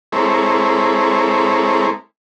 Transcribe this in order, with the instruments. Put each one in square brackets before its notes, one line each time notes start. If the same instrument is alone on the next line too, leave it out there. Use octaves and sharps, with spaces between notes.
[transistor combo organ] G#3 C4 E4 A4 A#4 C#5